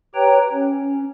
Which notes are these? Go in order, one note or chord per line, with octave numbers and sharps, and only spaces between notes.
G4 B4 C#5 G5 A#5
C#4